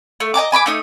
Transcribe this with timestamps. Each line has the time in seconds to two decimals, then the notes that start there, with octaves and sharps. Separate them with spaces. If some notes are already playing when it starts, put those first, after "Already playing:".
0.20 A3
0.34 D#5 G#5 A#5 D6
0.52 G#5 B5 C#6 D6
0.66 A3 D#4 D#6